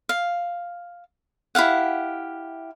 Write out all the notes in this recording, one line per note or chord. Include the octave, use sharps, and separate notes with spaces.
F5
E4 G4 F5 F#5